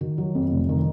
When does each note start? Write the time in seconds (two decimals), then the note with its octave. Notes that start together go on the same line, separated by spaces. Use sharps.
0.01 D#3 F#4
0.18 F#3
0.35 F2
0.51 F1
0.69 D#3